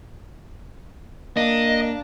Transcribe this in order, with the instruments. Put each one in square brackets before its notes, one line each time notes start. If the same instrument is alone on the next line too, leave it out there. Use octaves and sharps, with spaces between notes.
[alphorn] A#3 [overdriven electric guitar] D4 [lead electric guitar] D#5